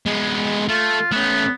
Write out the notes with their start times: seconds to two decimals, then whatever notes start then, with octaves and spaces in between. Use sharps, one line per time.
0.06 G#3 B3
0.69 A3 F4
1.12 A3 B3 C#4